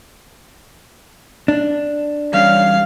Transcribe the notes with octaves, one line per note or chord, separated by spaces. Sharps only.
D4
E2 G3 C#4 F5